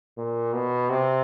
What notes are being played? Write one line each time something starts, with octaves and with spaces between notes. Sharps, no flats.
A#2
B2
C3